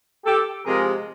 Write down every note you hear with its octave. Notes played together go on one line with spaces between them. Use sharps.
G4 A4
C3 F3 G#3 G#4 A#4